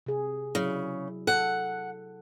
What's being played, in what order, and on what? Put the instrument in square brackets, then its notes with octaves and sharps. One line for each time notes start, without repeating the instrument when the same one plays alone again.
[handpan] C3 G#4
[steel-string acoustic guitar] C#3 [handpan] F#3 E4
[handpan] A4 [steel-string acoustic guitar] F#5